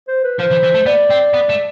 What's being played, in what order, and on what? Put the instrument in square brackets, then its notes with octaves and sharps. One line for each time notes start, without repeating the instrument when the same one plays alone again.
[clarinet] C5
B4
[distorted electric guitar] F3 [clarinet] C5
[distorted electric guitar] E3
E3
A3
[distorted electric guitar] B3 [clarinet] D5
[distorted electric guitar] C4
B3
A3